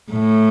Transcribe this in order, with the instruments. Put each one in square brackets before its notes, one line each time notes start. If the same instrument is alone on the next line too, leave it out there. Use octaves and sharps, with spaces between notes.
[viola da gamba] A2